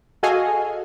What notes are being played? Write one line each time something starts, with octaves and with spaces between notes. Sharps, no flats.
F#4 G#4 A4 D#5 F5 G#5